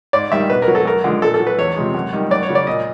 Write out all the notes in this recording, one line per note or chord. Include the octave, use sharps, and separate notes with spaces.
G#2 D5
D#3 G3 E5
B2 B4
A#4
F#3
A4
F#2 A#4
D3 F3 G#3
A#2 A4
A4
F#3
B4
E2 C#5
C3 F3 G#3
F#2
D#3 G3
F#2 D5
C#5
C#3 F#3
D5
A#2 D#5